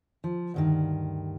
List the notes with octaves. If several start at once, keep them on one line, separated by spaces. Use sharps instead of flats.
F3
D2 G2 D#3